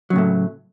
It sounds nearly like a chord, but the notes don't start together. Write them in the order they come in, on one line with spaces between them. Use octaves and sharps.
F#3 C#3 A2 A3